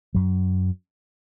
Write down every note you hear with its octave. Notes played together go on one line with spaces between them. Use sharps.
F#2 F#3